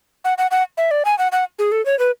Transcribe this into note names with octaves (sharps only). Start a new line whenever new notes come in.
F#5
F#5
F#5
E5
D5
G#5
F#5
F#5
G#4
A4
C#5
B4